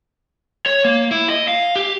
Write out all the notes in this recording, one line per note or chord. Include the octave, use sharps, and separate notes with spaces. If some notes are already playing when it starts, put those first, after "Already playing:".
C#5
A#3
E4
D#5
F5
G4